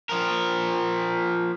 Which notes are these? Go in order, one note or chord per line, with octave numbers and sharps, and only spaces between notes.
F3 A#4